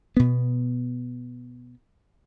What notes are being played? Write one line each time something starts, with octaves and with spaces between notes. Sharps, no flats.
B2 B3